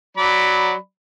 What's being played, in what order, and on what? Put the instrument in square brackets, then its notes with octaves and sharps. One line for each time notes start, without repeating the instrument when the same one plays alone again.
[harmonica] F#3 D5 B5